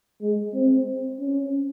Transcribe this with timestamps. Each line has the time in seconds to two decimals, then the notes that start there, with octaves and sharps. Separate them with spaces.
0.22 G#3
0.54 C4
1.20 C#4